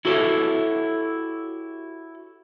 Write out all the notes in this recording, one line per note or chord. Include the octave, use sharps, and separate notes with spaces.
E4 F#4 G4 A4 C#5 E5